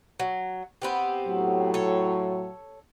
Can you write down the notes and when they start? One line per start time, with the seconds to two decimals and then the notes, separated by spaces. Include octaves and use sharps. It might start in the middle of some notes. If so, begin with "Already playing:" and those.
0.20 F#3
0.82 B3 C4 G4
1.26 A2 F#3
1.74 A4 C#5